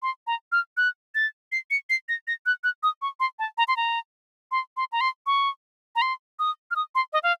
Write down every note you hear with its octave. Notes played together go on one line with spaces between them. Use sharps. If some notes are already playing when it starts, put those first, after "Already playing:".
C6
A#5
F6
F#6
A6
C7
C#7
C7
A#6
A#6
F#6
F#6
D#6
C#6
C6
A5
A#5
C6
A#5
C6
C6
A#5
C6
C#6
A#5
C6
D#6
F6
D#6
C6
D#5
F5